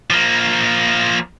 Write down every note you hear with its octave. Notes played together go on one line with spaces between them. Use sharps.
F3 A#3